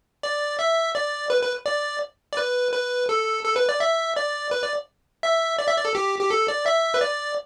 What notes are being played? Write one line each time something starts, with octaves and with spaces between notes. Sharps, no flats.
D5
E5
D5
B4
B4
D5
D5
B4
B4
A4
A4
B4
D5
E5
D5
B4
D5
E5
D5
E5
D5
A4
G4
G4
A4
D5
E5
B4
D5